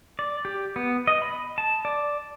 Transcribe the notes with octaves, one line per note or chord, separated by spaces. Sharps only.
D5
G4
B3
D#5
B5
A5
D5